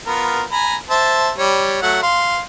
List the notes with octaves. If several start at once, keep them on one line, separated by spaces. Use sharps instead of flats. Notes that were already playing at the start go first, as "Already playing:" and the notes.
B3 F4 A#4
G#5 A#5 B5
C5 E5 A5
G3 C#5
F#3 A3 F#5
F5 C6